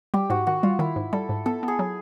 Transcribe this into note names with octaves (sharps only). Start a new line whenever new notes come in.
G3 G4
G#2 F#4
D#3 F#4
G3 F4
D#3 E4
G#2
G3 A4
G#2
B3 A4
B3
G#4
F#3